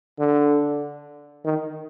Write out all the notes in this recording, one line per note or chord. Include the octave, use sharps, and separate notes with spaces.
D3
D#3